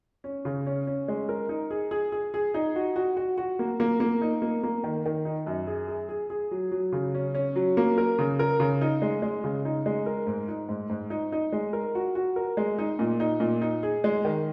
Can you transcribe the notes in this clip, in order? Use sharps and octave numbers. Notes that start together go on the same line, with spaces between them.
C#4
C#3
C#4
C#4
G#3
A#4
D#4
G#4
G#4
G#4
G#4
D#4
F#4
F#4
F#4
F#4
A#3
A#3
A#3
D#4
A#3
A#3
D#3
D#3
D#4
F#2
G#4
G#4
G#4
G#4
F#3
F#3
C#3
C#4
C#4
F#3
A#3
A#4
C#3
A#4
C#3
D#4
G#3
G#3
C#3
D#4
G#3
A#4
G#2
D#4
G#2
G#2
D#4
D#4
G#3
A#4
F#4
F#4
A#4
G#3
D#4
A#2
D#4
A#2
D#4
G#4
G#3
D#3